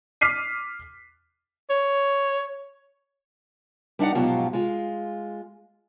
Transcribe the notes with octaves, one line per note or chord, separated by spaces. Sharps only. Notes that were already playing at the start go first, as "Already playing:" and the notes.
D6 F6 B6 C7 D#7
C#5
G3 D4 D#4 D5 F#5
G#2 B2 F3 F#3 F4 G4
G#3 F4